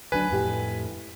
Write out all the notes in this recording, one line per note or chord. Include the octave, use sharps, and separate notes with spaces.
D2 F#3 D4 B4 G#5
F2 A2 G4